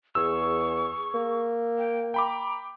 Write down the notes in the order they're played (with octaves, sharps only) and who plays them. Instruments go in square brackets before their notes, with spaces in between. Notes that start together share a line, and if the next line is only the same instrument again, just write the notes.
[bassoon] E2 [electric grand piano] G#4 E6 [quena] C#6
[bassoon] A#3
[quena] G5
[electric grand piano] G5 B5 D6 [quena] A#5